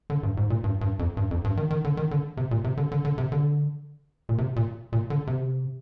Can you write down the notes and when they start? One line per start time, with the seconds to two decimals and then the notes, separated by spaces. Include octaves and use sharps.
0.10 D3
0.23 G2
0.37 G#2
0.50 A#2
0.64 G2
0.81 G2
0.99 F2
1.17 G2
1.31 F2
1.44 G2
1.57 D#3
1.70 D#3
1.84 D3
1.97 D#3
2.11 D3
2.37 C3
2.51 A#2
2.64 C3
2.77 D3
2.92 D3
3.05 D3
3.18 C3
3.32 D3
4.29 A#2
4.38 C3
4.56 A#2
4.92 A#2
5.10 D3
5.27 C3